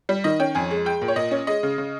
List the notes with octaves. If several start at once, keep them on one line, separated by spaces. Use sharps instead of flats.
G3
D#3 D#5
C#4 G5
F2 G#5
G#3
G#3 G5
A#2
C#5
A#2 D#5
C#4
G#3 D#5
C#3
C#3